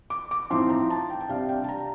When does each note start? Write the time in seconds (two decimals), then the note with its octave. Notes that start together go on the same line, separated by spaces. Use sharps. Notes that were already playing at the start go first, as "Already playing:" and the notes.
0.10 D6
0.31 D6
0.50 A2 F3 C4 D#4 C6
0.70 A#5
0.90 A5
1.10 G5
1.20 G5
1.29 C3 G3 D4 F5
1.49 G5
1.64 A5
1.69 A#5